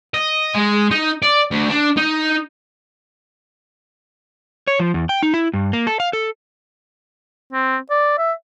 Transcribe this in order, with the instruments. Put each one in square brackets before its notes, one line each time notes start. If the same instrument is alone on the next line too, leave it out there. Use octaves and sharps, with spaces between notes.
[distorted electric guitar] D#5
G#3
D#4
D5
D2
D4
D#4
[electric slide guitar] C#5
F3
E2
G5
D#4
E4
G2
A#3
A4
F5
A4
[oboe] C4
D5
E5